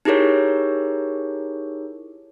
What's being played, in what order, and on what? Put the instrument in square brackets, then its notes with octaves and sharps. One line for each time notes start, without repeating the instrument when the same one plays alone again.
[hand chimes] D#4 E4 G4 G#4 A#4 C#5